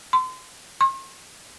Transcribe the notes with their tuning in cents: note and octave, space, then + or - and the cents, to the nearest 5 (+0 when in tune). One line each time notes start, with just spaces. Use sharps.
C6 -30
C6 +45